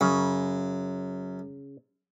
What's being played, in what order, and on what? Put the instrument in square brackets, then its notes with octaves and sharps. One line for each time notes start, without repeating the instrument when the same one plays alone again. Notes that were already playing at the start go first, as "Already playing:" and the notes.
[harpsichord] F#2 [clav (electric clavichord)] C#3